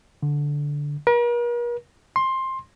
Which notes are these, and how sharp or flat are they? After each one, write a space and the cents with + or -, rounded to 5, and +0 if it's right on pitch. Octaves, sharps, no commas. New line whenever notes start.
D3 -10
A#4 +45
C6 +15